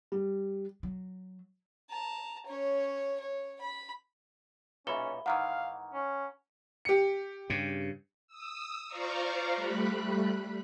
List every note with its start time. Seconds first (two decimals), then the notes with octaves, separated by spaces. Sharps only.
0.12 G3
0.83 F#3
1.90 A5 A#5
2.46 C#4 C#5
3.20 C#5
3.61 B5
4.87 B1 A#2 C#4 A4 E5 B5 G7
5.26 G#2 D#3 E3 F5 F#5 A#5 F6
5.93 C#4
6.85 G4 C#7
7.50 G2 C#3
8.28 D#6 E6
8.87 F4 C5 D5 F5 A#5 C#6
9.55 G3 A3 B5 F#6